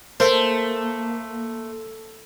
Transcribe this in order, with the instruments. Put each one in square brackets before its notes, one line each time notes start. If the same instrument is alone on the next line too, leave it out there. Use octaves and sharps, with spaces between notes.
[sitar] A3 [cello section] A#3 [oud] A#4 [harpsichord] C5